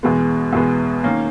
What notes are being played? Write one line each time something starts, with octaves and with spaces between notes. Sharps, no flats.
E2 B2 G#3 B3
E2 B2 G#3 B3
D#3 A#3 C#4